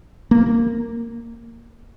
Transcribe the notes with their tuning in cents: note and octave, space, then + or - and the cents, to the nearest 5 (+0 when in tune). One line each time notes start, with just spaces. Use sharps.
A#3 -10